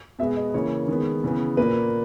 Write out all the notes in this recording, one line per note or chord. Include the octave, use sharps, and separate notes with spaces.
B2 G#3 B3 E5
D#5
C#3 E3 A#3 C#5
D#3 G#3 B3
C#3 E3 B3
A#2 A#3 B4